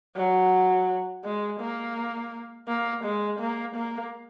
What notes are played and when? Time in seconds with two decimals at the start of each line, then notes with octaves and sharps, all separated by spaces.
0.16 F#3
1.24 G#3
1.60 A#3
2.68 A#3
3.04 G#3
3.40 A#3
3.75 A#3